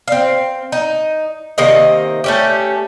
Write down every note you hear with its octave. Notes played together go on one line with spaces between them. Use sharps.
C4 F5
D#4
C3 D#3 A#3 D#5
A3 C#4 G4